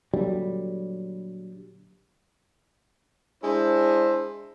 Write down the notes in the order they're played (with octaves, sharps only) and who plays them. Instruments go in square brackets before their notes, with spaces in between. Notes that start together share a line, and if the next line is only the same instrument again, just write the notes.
[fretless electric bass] A#2 D3 F#3 G3
[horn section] G#3 D4 E4 C5